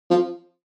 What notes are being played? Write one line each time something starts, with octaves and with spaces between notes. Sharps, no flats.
F3